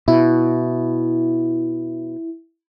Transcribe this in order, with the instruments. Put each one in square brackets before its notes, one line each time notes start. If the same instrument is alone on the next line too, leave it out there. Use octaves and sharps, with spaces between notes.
[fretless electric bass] B2 [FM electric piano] E4